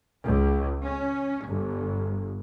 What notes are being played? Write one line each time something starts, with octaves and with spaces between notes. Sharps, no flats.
C#2
C#4
G1